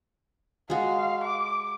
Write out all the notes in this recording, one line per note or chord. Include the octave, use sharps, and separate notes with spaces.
G#3 F#4 F5
D6